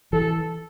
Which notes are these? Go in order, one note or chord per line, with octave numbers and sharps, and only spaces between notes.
E3 A4